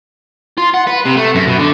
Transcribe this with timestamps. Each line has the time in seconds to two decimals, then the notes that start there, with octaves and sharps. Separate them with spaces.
0.58 F4
0.74 F#5
0.87 B4
1.05 C3
1.17 A3
1.35 F#2
1.47 B2
1.59 D3